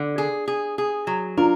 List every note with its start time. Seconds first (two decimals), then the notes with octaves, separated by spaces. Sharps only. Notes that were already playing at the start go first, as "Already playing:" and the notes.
Already playing: D3
0.18 G#4
0.48 G#4
0.78 G#4
1.07 F#3
1.37 D4 F4 A#4